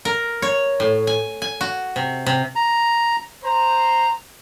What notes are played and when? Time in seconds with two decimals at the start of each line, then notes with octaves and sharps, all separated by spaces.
0.05 A#4
0.42 C#5
0.80 A2
1.07 G#5
1.42 G#5
1.61 F#4
1.96 C3
2.26 C3
2.56 A#5
3.44 C5 A#5